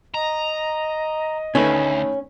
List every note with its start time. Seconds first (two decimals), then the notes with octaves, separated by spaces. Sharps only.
0.14 D#5 A#5
1.55 D2 D#3 A3 C#4 B4